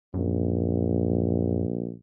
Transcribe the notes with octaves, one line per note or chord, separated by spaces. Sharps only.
A#1 F#2